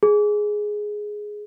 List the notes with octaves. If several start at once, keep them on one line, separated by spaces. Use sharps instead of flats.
G#4